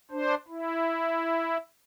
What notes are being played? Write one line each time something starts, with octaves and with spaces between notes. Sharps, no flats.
D4 C5
E4